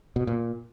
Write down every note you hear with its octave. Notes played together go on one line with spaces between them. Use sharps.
B2
A#2